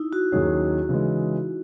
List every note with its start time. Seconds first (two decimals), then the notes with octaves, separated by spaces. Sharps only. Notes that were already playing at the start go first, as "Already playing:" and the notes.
Already playing: D#4 E4
0.13 F#4
0.32 D#2 D#3 F#3 C#4 G#4
0.89 C#3 E3 G#3